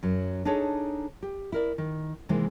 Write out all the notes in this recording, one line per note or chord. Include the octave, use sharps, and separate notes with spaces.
F#2 F#3
D4 D#4 G#4 A4 C#5 D#5
G4
E4 A#4 D5
D#3
C3 D#3 E3 G#3 A#3